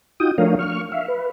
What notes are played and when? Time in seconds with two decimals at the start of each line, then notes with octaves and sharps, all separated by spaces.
0.20 D#4 F4 F#4 G5 D#6
0.38 F3 A3 D4 A#4 C#5 F5
0.59 C#6 F6
0.92 E5 F5
1.08 B4